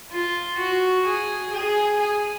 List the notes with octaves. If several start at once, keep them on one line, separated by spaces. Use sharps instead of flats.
F4
F#4
G#4
G#4
G#4